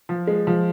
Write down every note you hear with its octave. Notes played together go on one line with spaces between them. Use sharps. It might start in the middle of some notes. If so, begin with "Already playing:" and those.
F3
G#3
F3